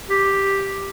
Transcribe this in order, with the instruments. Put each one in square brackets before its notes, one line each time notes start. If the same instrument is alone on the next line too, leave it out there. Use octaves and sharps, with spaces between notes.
[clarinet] G4